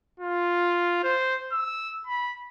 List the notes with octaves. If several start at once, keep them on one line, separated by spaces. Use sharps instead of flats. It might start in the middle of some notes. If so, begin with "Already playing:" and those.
F4
C5
E6
B5